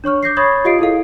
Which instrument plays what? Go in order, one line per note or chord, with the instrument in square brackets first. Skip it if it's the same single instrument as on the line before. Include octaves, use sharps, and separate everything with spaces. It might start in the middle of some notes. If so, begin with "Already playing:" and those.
[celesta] D4 C#5 C#6 F6
D6 G6 A#6 C7
C#5 B5 C#6 D#6 G#6 A6
F4 G4 D#5 F5 C7 D7
E4 G#4 A4 F5